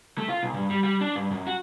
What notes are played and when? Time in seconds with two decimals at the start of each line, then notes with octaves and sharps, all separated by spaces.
0.18 A3
0.29 F4
0.43 B1
0.54 G2
0.70 G3
0.84 G3
1.01 D4
1.16 G2
1.31 F#2
1.47 F#4